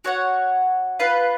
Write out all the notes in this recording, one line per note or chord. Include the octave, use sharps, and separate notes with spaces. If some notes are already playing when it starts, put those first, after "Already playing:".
F#4 C#5 F#5
F4 B4 F5